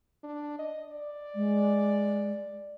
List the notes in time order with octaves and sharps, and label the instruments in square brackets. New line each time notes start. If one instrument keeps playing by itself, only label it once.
[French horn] D4
D#5
D5
[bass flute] G#3